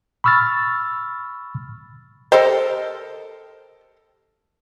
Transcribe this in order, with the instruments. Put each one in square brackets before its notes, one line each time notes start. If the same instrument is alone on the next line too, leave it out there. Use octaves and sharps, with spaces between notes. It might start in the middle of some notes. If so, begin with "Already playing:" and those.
[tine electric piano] B5 C#6 E6 F6 A6
[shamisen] G4 C5 [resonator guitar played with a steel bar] A4 A#4 D#5